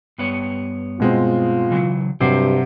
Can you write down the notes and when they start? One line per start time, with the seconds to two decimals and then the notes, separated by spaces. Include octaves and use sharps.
0.18 G2 B3 C#5
1.00 B2 G#3 C4 F4
1.70 C#3 E3 F#3
2.21 G2 C3 F#3 G4 C5